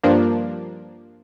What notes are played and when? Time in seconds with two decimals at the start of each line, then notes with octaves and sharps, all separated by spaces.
0.04 G2 F3 A#3 D4